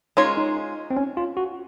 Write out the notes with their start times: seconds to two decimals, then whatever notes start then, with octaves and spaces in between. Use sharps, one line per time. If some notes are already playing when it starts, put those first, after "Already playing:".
0.17 G#3 C#4 D#4 F4 A#4 C#5
0.37 D#4
0.90 C4
0.97 C#4
1.17 F4
1.37 F#4